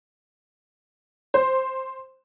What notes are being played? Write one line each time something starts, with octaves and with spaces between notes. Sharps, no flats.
C5